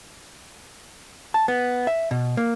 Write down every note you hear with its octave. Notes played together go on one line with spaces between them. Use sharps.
A5
B3
E5
B2
A#3